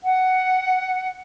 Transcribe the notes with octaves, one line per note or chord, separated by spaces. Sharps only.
F#5